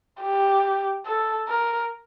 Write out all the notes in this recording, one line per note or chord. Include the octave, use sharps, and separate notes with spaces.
G4
A4
A#4